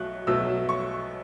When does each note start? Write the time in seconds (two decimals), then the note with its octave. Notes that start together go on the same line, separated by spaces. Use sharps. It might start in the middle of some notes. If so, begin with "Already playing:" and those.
Already playing: B1 B2 F#3 A3 F#6
0.27 B1 B2 F#3 A3 E6
0.69 C#6